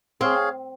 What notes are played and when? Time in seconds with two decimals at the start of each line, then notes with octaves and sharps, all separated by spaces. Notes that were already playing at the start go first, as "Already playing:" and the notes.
0.21 C4 G#4 C#5 F5